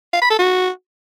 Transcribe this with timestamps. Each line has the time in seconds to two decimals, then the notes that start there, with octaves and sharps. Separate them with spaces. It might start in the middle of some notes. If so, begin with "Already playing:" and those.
0.13 F5
0.22 B5
0.30 A4
0.39 F#4